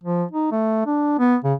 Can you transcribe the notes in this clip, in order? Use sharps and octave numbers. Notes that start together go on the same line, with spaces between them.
F3
D#4
A3
D4
B3
C#3